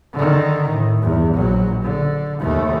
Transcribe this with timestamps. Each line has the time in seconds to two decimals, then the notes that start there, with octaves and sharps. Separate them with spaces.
0.14 D3 D#3
0.70 A2
1.02 E2 G2
1.34 A#1 F#3
1.83 D3
2.40 D#2 A3